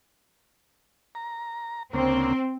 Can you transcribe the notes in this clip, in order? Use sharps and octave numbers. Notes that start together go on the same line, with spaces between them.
A#5
D2 C#3 A#3 C4